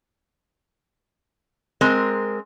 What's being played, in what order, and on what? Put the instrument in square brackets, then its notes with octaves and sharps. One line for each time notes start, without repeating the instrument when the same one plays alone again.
[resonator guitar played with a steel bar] G#3 C4 A#4